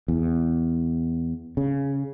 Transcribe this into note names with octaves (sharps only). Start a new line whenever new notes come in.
E2
C#3